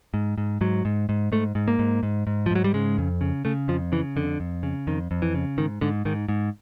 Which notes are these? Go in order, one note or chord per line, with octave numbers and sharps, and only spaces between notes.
G#2
G#2
G#2 F#3
G#2
G#2
G#2 A3
G#2
A#3
G#2
G#2
G#2
F3
G#2 F#3
G3
C#3 G#3
F2
C#3
C#3 A3
F2 F3
C#3 E3
F2 D3
F2
C#3
F2 D#3
F2
E3
C#3
G#2 D#3
G#2 D3
G#2 D#3
G#2